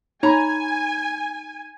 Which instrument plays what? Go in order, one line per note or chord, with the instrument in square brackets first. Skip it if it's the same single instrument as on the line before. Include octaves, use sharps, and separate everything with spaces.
[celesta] D#4 B5 [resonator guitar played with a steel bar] C#5 A#5 [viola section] G#5